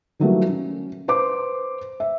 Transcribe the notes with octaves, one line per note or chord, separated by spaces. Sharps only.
D#3 E3 F#3 G3 A3 A#3
C#4
B4 C5 C6 D6
E5